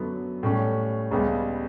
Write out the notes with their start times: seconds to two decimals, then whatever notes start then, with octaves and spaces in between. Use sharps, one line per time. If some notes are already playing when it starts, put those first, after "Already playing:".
Already playing: F#2 D3 F#3 B3
0.43 A2 G3 C#4
1.11 C#2 C#3 G3 B3